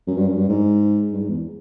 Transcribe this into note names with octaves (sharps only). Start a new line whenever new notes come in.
F#2
G2
F#2
G2
G#2
G2
G#2
E2